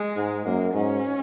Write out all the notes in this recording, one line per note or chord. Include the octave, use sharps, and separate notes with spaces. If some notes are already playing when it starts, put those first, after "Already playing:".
Already playing: G#3
G#2
F#2 A#3
G#2 C#4